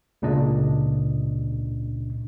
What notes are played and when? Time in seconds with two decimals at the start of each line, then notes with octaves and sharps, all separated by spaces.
0.22 C#2 A#2 C#3 D4 D#5